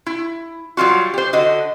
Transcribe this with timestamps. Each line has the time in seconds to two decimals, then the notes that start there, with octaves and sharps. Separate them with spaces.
0.06 E4
0.77 F#3 G3 F4 F#4
1.14 G4 C5
1.33 D3 F#4 D#5